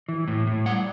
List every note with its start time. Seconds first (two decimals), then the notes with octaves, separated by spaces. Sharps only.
0.08 E3
0.28 A2
0.47 A2
0.66 G3 F#5